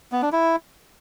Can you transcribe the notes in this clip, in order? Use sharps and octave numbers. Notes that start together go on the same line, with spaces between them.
B3
D4
E4